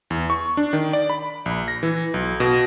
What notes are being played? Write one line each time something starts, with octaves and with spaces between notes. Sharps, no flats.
E2
C#6
D4
D#3
D5
B5
A#1
A#6
E3
B1
B2